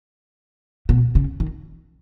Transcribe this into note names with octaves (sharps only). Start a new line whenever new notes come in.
B2
C#3
D#3